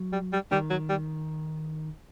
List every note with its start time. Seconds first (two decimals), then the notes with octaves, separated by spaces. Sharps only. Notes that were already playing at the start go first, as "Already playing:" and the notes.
Already playing: F#3
0.13 G3
0.33 G3
0.52 D#3 G3
0.70 F#3
0.89 G3